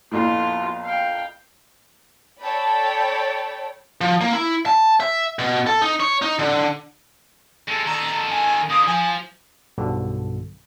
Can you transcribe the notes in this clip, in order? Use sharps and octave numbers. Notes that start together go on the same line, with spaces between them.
A#1 F2 A2 B3 F4
F5 G5
A4 C#5 D5 G5 A5 B5
F3
A#3
E4
A5
E5
B2
A4
D#4
C#5
D#4
D3
G#3 A4
D#3 A4 A#5
G#5
D3 A#3 D#6
F3 G#5
B1 G2 B2 D3